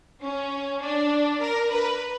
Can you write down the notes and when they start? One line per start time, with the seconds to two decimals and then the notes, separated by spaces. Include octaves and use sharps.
0.22 C#4
0.82 D4
1.41 A#4
1.72 B4